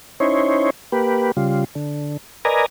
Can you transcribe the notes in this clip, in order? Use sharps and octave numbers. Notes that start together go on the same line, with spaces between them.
C#4 D#4 E4 C5 C#5
A#3 G4 B4
C#3 G3 F4
D3
A#4 B4 D5 D#5 G#5 A#5